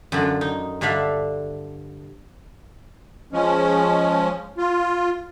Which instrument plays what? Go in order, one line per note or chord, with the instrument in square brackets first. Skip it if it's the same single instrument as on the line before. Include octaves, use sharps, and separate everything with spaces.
[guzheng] F#2 D3 F4
D#4
G2 D3 D4 A4 E5 F5
[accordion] F3 G#3 C#4
F4